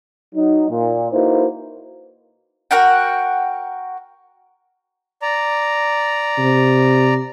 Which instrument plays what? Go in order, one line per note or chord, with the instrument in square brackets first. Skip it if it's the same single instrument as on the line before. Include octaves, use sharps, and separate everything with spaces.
[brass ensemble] F#3 D#4
A#2
A#3 D#4 E4 F#4 B4 C5
[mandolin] F#4 A#4 F#5 G5
[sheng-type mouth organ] D5 A#5
[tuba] C3